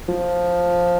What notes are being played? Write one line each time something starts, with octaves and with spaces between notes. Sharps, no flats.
F3